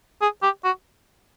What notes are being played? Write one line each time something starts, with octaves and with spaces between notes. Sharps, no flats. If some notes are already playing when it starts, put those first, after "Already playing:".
G#4
G4
F#4